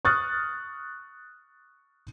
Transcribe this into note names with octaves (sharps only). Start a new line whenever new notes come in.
C#6 D#6 F6 F#6 A6